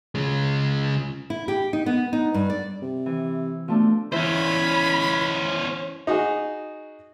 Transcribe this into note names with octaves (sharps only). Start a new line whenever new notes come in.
C#3 G#3
E4
G4
D#4
B3
D#4
G2
D5
C3
E3
B2 F3 A3 D4
E3 C#4 E4 C5 B5
D#4 F#4 G#4